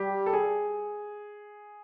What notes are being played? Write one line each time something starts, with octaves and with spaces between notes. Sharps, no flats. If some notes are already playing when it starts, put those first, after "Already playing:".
Already playing: G3 G4
A4
G#4